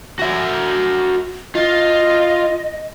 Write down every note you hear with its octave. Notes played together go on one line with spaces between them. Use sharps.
F#4 E5
F4 D#5